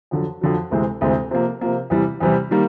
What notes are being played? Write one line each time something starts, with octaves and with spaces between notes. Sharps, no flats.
F2 D3 F#3
F2 D3 F#3
D2 C3 E3 G#3 C4
D2 C3 E3 G#3 C4
C3 F3 A#3
C3 F3 A#3
E2 C3 E3 G3
E2 C3 E3 G3
D#3 G3 A#3